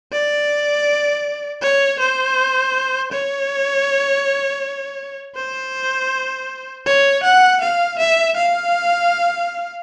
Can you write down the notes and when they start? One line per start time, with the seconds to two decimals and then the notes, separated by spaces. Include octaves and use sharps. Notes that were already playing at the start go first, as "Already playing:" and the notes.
0.12 D5
1.62 C#5
2.00 C5
3.12 C#5
5.36 C5
6.86 C#5
7.24 F#5
7.61 F5
7.99 E5
8.37 F5